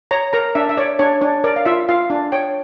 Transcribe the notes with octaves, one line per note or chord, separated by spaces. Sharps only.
C#5 A#5
A#4 A#5
D4 E5
E5
C#5 D5
D4 C#5
D4 C#5
A#4 D5
F5
F4 E5
F4 F5
D4
C#5 G5